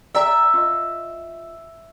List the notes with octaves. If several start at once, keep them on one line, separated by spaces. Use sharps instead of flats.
D5 E5 G5 A#5
F4 D#5